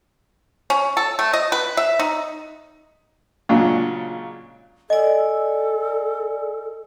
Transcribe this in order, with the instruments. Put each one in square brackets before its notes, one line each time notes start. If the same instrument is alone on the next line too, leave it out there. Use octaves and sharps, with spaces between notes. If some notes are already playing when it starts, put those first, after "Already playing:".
[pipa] C#4
A4
A3
D#5
B4
E5
D#4
[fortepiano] A#2 C#3 F#3 G#3 D4
[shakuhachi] A4 [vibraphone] D5 G#5 [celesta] D#5